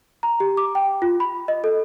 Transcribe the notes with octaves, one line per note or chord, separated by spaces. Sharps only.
A#5
G4
D6
G5
F4
B5
D#5
A4